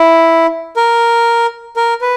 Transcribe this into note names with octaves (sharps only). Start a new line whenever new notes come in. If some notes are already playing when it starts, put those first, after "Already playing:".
Already playing: E4
A#4
A#4
B4